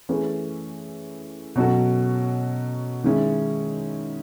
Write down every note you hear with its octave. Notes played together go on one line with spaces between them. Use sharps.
E3 A3 C#4 G#4 B4
B2 F#3 C#4 F#4 A4
D#3 G#3 C#4 E4